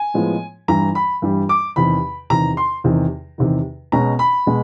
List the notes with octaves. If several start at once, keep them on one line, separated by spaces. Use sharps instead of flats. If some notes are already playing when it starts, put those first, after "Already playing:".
Already playing: G#5
A2 F3 G#3 B3
G2 E3 G3 A#5
B5
G2 E3 G3
D6
E2 C3 D#3 B5
E2 C3 D#3 A#5
C6
E2 C3 D#3
E2 C3 D#3
B2 G#3 C#4 A#5
B5
B2 G#3